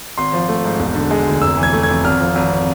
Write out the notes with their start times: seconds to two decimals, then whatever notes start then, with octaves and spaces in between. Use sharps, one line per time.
0.18 G#1 C6
0.33 F3
0.49 A3
0.65 G#2
0.80 E1
0.95 D3
1.11 G#3
1.27 D2
1.42 F1 E6
1.57 E3
1.63 G#6
1.73 A3
1.83 G#6
1.89 F2
2.04 G#1 F6
2.20 F3
2.35 G#1